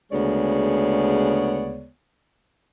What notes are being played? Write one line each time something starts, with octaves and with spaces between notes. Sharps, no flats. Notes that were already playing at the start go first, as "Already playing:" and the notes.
D2 C#3 G#3 B3 C#5 D5